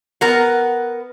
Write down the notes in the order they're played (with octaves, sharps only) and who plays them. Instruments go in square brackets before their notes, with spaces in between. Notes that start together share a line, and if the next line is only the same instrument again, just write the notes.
[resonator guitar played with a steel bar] B3 A#4 F#5